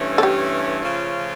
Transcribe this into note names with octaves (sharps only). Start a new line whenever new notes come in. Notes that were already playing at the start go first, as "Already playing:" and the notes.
Already playing: G2 E3 A3 C#4
A4
G4
C#3 F3 A3 C#4 F4